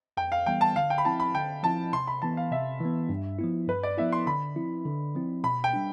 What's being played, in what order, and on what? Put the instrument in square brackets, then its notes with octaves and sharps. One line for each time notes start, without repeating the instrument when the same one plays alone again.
[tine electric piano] F2 [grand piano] G5
[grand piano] F5
[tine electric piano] E3 G3 B3 [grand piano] G5
[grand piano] A5
[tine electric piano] D3 [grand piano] F5
[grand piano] G5
B5
[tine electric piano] F3 C4 E4 [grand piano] A5
[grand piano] B5
[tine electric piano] D3 [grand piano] G5
[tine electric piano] F3 C4 E4 [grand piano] A5
[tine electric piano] C3 [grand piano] C6
[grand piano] B5
[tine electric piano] E3 B3 [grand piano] A5
[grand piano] F5
[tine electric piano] C3 [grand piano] E5
[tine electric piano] E3 B3
G2
F3 B3 E4
[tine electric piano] G2 [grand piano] B4
[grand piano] D5
[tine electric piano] F3 B3 E4 [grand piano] E5
[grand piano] C6
[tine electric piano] D3 [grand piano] B5
[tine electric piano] F3 C4 E4
D3
F3 C4 E4
[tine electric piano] B2 [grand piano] B5
[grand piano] G5
[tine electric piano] G3 D4